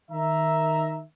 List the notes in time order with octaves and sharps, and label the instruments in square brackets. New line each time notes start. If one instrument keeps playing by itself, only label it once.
[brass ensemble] D#3 E5 A#5